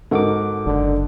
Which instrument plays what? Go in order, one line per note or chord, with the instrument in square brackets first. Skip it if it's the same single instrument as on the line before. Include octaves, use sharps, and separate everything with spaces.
[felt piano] G#2 F#4 A#4 [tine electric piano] A4 F#5 D6
[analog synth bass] F#1 [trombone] D3